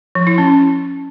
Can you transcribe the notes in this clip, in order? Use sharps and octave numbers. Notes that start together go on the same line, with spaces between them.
F3
E4
C#4